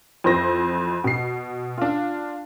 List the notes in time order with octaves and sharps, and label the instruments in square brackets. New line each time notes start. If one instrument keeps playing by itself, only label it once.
[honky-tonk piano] F2 E3 C5 A#6
B2 C7
D4 F4